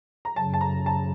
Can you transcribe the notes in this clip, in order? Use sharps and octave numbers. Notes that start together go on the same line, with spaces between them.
A#5
F#2 C#3 F#3 A5
A5
A#5
A5